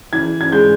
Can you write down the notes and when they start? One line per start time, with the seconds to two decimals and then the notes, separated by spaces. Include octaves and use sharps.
0.13 E3 G#6
0.41 G#6
0.52 G#3 G6